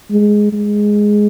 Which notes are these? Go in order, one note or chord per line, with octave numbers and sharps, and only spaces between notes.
G#3
G#3